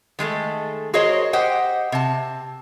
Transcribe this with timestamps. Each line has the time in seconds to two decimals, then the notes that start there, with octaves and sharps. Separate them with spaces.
0.19 D#3 G#3 A3 A4
0.94 F#4 G#4 A#4 C5 C#5 D#5
1.33 G4 C5 D#5 F#5 G5
1.92 C3 A5